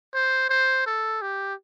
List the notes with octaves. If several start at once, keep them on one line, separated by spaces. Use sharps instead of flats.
C5
C5
A4
G4